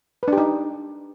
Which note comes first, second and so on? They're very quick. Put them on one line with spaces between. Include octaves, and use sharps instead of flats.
B4 D4 G4 D#4